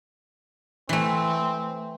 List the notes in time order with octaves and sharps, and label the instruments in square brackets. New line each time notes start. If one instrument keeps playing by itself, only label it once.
[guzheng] E3 A3 [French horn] C4